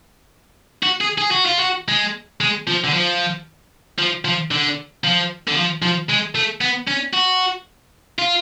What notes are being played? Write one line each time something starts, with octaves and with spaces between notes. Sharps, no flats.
F#4
G#4
G#4
F#4
F4
F#4
G#3
G#3
F3
D3
F3
F3
F3
D3
F3
D3
F3
F3
G#3
A3
B3
C#4
F#4
F4